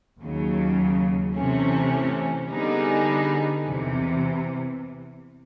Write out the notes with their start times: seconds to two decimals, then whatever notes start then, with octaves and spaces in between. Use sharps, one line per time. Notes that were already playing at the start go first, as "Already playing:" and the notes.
0.20 D#2 C#3 F#3
1.35 C3 E3 A3 C#4
2.49 D3 G3 B3 D#4 G#4
3.64 E2 C3 E3